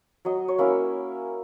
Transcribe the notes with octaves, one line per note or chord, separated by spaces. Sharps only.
F#3 D#5
C#5
A#3 C#4 E4